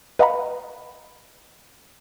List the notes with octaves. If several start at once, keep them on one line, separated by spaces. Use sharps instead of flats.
B4 D#5 F5 F#5 A#5 B5